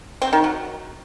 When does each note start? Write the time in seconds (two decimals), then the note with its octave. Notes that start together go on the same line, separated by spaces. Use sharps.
0.22 C4
0.33 D#3
0.44 F#3